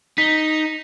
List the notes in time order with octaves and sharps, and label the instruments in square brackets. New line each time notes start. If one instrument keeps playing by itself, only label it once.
[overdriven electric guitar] D#4 [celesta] B6